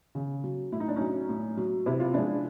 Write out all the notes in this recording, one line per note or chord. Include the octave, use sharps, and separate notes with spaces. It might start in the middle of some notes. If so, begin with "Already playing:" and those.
C#3
F#3
A2 E4
D#4
D4
F#3 C#4 D#4
A2
F#3
C3 E4
F4
F3 G#3 D4 E4